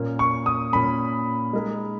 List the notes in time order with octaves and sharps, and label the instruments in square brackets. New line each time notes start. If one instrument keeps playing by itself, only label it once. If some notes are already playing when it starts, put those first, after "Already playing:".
Already playing: [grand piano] A#2 A#3 C#4
[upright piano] C#6
D#6
[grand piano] A#2 A#3 C#4 [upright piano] B5
[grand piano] G#3 D#4 A#4